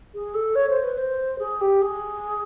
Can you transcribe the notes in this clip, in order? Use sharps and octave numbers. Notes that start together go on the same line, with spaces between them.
G#4
A4
C#5
C5
B4
C5
G#4
G4
G#4